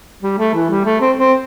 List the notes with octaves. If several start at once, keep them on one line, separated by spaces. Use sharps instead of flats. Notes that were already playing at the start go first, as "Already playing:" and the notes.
G3
A3
E3
G3
A3
C4
C4